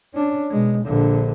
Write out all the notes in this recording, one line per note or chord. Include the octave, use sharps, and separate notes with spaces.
C#4 D4
B2 G#3
A#1 D3